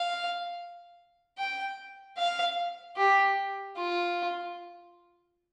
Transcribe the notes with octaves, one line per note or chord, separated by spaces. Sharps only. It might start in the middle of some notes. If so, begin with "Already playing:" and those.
Already playing: F5
G5
F5
G4
F4